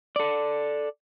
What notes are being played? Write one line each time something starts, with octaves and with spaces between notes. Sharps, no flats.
A4 D5